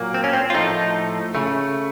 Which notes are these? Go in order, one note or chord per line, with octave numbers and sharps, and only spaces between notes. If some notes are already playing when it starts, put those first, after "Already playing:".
Already playing: A#2 F#3 A#3
C4
C#4
C4
F4
A2 F3 A3 D#4
C#3 A3